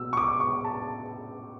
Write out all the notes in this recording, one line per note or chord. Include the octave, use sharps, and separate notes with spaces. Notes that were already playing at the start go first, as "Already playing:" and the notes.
Already playing: B2 E6
C#6
D6
C#6
A5